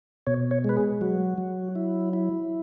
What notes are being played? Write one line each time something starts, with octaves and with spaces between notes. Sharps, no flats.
B2 C#5
C#5
G#3 B4
G#4
F#3 F#4
F#3
E4
E4